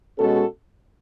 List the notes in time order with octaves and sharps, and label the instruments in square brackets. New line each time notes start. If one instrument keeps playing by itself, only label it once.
[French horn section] B2 G#3 C#4 F#4 A4